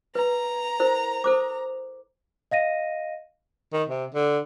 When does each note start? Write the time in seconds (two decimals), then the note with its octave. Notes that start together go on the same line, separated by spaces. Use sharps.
0.15 B4 A#5
0.80 E4 A#4 C5
1.24 A4 C5 D6
2.51 D#5 F5 A#6 D#7
3.73 D#3
3.88 C3
4.15 D3